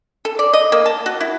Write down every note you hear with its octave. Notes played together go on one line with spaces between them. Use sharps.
A4
D5
D#5
A#3
A5
F#4
E4